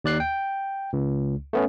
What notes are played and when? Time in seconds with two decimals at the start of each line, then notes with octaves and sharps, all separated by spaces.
0.04 D#2 D5 F#6 C7
0.20 G5
0.93 C#2
1.53 A3 B3 C#4